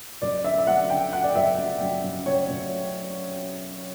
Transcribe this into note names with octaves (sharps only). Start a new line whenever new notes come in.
F#1 D5
D3 E5
E5
F#1 F#5
D3 G5
D3 F#5
D5
F#1 E5
F#2
F#2
F#2
F#1 C#5
F#1